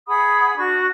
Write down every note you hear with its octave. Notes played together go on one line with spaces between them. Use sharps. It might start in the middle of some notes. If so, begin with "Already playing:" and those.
G#4 F#5 B5 D#6
D4 F#4 C#6